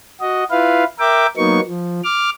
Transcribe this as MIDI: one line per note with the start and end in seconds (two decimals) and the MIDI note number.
0.21 0.44 66
0.21 0.44 75
0.51 0.84 64
0.51 0.84 65
0.51 0.84 71
0.51 0.84 77
0.99 1.26 70
0.99 1.26 76
0.99 1.26 79
0.99 1.26 86
1.37 1.60 54
1.37 1.60 58
1.37 1.60 59
1.37 1.60 63
1.37 1.60 85
1.66 2.01 53
2.04 2.30 86
2.04 2.30 89